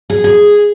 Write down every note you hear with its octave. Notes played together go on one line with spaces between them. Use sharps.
G#4
G#4